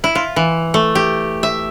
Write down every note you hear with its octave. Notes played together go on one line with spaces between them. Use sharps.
E4
F4
E3
A3
G4
E5